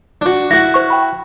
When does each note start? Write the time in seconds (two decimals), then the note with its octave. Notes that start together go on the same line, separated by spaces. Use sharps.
0.21 D4 F#4
0.51 E4 F#4 A#6
0.74 C5 C#6
0.90 G5 B5